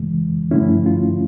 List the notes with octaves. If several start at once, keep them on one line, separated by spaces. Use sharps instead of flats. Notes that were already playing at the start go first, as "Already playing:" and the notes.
Already playing: F2 C#3 E3 G#3
G2 D3 F3 A3 C#4 E4
F4